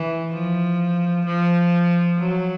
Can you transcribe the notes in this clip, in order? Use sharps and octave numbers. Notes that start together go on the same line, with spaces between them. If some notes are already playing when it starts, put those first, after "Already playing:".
Already playing: E3
F3
F3
F#3